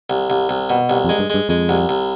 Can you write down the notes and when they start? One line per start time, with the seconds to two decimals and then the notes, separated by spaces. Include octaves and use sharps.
0.10 C2
0.30 C2
0.49 C2
0.70 B2
0.90 C2
1.04 F2
1.09 G#3
1.19 G2
1.30 G2 G#3
1.49 F2 G#3
1.69 C2
1.89 C2